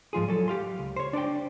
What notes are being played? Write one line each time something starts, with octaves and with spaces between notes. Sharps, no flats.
G#2 F3 F4 G#4
F#3 A4
G4 F5 C6
C#2
C5 C#5
D4 C5 D5 G5